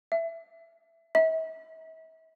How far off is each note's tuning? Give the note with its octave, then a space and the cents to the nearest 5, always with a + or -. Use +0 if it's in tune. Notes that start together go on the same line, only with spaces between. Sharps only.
E5 +10
E5 -40